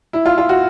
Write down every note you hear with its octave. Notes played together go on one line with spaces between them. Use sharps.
E4
F4
F4
F#4